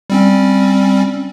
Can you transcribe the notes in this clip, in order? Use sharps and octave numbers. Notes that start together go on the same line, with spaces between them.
G3 C4 C#4